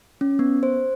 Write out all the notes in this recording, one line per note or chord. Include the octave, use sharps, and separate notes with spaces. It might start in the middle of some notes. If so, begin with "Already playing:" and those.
C#4
B3
C5